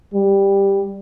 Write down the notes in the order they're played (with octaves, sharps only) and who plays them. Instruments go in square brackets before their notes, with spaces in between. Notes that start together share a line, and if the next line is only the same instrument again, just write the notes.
[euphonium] G3